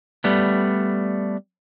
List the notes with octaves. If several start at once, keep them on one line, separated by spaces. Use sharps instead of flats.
G3 A3 B3